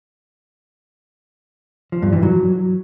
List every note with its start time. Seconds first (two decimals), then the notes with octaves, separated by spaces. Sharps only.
1.92 F3
2.02 G2
2.12 E3
2.23 F#3